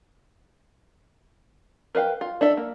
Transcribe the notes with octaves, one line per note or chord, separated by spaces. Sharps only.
A#4 B4 F5 G5
F4
D4 A4 E5
A#3